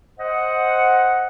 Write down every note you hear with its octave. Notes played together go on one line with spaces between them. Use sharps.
C5 D#5 F#5